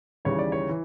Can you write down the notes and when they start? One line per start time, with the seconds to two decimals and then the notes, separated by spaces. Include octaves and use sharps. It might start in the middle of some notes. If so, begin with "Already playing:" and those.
0.25 D#2 C#3 E3 G3 C#5
0.39 D5
0.52 C#5
0.69 E3